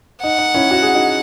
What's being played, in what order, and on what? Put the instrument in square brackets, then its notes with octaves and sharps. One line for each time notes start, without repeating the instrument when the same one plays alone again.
[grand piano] D#4 [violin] F#5
[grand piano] D#4
C#4 E4
F#4
G#4
D#4 F#4